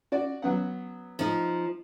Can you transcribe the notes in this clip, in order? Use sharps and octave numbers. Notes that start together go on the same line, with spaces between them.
F#4 D5
F#3 B3 F#5
F3 D#4